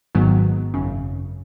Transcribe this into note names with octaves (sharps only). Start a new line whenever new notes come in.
G#1 G#2 D#3 F#3 B3
G#1 F#2 C#3